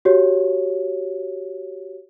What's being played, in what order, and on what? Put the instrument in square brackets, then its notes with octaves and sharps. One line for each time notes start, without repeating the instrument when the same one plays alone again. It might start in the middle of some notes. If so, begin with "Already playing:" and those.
[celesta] F#4 G4 C#5